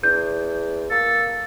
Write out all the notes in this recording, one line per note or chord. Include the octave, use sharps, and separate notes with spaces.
E2 G6
A#3 A4